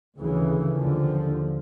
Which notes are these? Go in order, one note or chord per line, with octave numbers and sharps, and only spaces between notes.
D2 C#3 E3
D#2 D3 F3